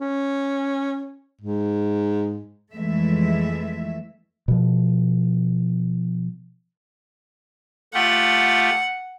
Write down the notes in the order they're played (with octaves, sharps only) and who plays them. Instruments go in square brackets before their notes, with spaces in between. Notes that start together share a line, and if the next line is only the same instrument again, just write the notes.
[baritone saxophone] C#4
G#2
[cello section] F2 E3 G#3 A3 E5
[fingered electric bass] B2 F3
[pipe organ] A3 F4 G4 [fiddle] F#5